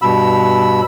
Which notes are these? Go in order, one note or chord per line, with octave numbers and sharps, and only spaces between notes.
G2 B2 B5 E6